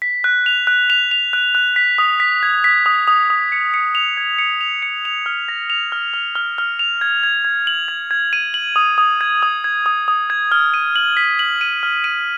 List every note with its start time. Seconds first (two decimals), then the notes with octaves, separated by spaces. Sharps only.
0.02 B6
0.24 F#6
0.46 F7
0.67 F#6
0.90 F7
1.11 F7
1.33 F#6
1.55 F#6
1.76 B6
1.98 D#6
2.20 B6
2.43 G#6
2.64 B6
2.86 D#6
3.08 D#6
3.30 D#6
3.52 C#7
3.74 C#7
3.95 F7
4.17 G#6
4.38 C#7
4.61 F7
4.82 C#7
5.05 F7
5.26 F6
5.49 A#6
5.70 F7
5.92 F6
6.14 F6
6.35 F6
6.58 F6
6.79 F7
7.01 G#6
7.23 G#6
7.45 G#6
7.67 F#7
7.88 G#6
8.11 G#6
8.33 D#7
8.54 F#7
8.76 D#6
8.98 D#6
9.21 G#6
9.43 D#6
9.64 G#6
9.86 D#6
10.08 D#6
10.30 G#6
10.52 F6
10.74 D#7
10.96 F#7
11.17 B6
11.39 F#7
11.61 D#7
11.83 F6
12.04 D#7